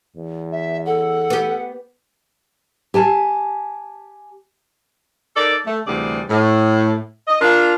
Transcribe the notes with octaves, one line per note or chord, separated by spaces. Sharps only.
E2
E5
A4 F#5
B3 G4
G4 G#5 A5
D#4 A4 A#4 D5
A3
D2 C3 E3 G3 G#4 D5
A2
D#5
D4 F4 A#4